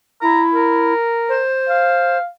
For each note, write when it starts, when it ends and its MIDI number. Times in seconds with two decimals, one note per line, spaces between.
0.21 0.93 64
0.21 0.42 82
0.54 1.41 70
1.28 2.17 72
1.69 2.26 77